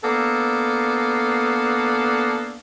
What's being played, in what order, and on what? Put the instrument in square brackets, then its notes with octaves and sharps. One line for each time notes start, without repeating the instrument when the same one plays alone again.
[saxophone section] A#3 B3 D4 A4